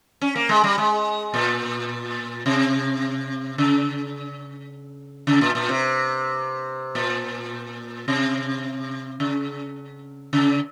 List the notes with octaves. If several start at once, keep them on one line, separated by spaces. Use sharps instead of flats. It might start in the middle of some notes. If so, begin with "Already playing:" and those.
C#4
A#3
G#3
G3
G#3
A#2
C3
C#3
C#3
A#2
A#2
C3
A#2
C3
C#3
C#3